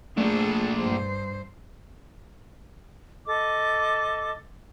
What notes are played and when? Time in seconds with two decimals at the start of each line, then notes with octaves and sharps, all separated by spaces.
0.17 A#2 A3 D4 G#4 A4
0.79 G2 C5
3.25 A4 D#5 D6